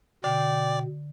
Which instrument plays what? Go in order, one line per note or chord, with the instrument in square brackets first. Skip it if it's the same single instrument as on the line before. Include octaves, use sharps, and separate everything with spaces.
[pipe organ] B2 [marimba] D3 [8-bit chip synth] D5 [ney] G5